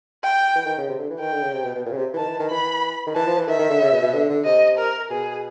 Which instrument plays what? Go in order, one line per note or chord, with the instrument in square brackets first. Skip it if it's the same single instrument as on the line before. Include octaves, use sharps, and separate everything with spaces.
[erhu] G5
[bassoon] E3
D#3
C#3
C3
D3
E3
[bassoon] D#3 [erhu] G5
[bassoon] D3
C#3
C3
B2
B2
A#2
C#3
C3
E3
[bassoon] D#3 [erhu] A5
[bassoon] E3
D#3
[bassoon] E3 [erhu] B5
[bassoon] D#3
[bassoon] E3 [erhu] A5
[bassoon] F3
E3
[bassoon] D#3 [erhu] E5
[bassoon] D#3
D3
C#3
B2
B2
D3
D3
[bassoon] C3 [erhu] D#5
[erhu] A#4
[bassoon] B2 [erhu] G#4